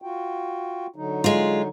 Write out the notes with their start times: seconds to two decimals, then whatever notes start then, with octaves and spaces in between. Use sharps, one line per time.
0.02 F4 F#4 G5
0.96 D3 F#3 D#4
1.24 G#3 F4